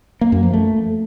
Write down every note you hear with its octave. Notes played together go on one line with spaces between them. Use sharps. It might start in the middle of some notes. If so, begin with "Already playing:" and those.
A#3
F#2
F3
A3